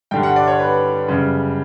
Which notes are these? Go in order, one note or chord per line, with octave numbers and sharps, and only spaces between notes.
G2 D3 G3 G5
F#5
D5
C#5
B4
F#2 C#3 G3